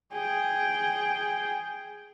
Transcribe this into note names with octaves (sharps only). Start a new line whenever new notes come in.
G#4 G5